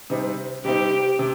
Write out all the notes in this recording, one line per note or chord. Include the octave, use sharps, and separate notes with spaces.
C3 G3 C4 D#4
C3 G3 C4 D#4 G4
C3